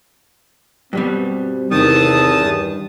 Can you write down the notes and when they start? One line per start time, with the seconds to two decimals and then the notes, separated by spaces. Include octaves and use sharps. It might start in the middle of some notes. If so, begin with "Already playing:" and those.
0.93 G2 B2 G3 C4
1.71 E2 C3 D#3 A5 D#6
2.42 G2